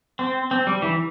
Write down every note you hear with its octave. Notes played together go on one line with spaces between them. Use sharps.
C4
C4
G3
E3